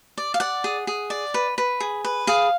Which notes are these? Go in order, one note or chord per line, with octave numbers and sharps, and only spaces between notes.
D5
F5
D5 F#5
G#4
G#4
D5
B4
B4
G#4
B4
G#4 F5